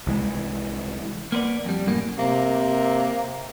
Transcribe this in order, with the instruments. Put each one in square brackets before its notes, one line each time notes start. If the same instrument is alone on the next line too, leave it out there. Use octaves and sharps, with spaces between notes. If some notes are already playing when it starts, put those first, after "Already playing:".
[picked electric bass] C2 E3 G#3
[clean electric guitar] A#3 B3 B4 D5
F2 G3
F#2 A2 A#3
[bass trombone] C3 [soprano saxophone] A#3